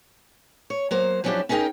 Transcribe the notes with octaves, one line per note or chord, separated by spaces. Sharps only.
C#5
F#3 A#3 C5
F3 F#3 C#4 D4 E4 G4
C#4 D#4 G#4 A#4 G5